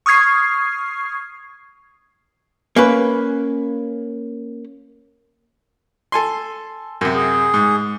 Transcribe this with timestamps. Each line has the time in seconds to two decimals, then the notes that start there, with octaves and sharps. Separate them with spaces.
0.06 C#6 D#6 F6 G#6 C7
2.76 A#3 C#4 B4
6.12 A4 G#5 C6
7.01 F#2 C3
7.15 G#4
7.54 G#2